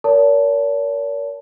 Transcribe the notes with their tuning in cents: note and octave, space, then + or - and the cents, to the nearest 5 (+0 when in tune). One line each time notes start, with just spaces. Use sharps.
A#4 +0 C#5 +45 A5 +0